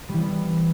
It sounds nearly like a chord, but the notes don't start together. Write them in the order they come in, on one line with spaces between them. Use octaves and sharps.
G3 E3 B3